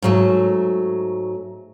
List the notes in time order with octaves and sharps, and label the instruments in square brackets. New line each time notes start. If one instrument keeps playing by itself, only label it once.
[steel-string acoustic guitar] G#2 F#3 A3